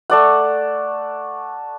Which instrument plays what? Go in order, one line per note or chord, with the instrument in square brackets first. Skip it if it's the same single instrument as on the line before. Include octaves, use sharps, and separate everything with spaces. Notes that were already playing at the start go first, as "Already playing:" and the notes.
[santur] A3 D5 F#5